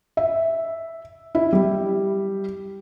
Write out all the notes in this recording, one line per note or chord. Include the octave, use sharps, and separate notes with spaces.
E5
E4
G3